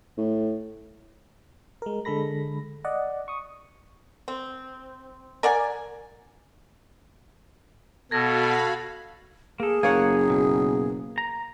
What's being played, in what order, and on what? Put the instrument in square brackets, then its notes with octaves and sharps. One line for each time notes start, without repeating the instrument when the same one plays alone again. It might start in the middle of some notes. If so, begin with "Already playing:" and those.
[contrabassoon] A2
[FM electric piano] G#3 A#4
D3 G#3 A4 B5 A#6
D5 D#5 F#5
C#6 D#6
[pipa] C4
A#4 D5 F#5 G#5
[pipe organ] B2 [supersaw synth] F#4 F5 B5 [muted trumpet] A4 [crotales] G#6 A#6
[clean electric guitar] A#3 A4 [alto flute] G#4
[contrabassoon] F#1 [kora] A#3 C#5 F#5 [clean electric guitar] G#5
[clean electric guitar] B2
A#5